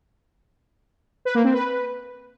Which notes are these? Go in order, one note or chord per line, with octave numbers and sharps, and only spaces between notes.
B4
A#3
C4
B4